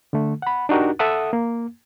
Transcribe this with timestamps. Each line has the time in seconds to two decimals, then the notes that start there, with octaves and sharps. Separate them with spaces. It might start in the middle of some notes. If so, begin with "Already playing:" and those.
0.13 D3 A3
0.42 F#5 B5
0.69 D4 D#4 F#4 G4 A#4
0.99 A4 E5 F#5 D#6
1.33 A#3